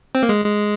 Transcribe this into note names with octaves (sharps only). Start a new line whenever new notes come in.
C4
A#3
G#3
G#3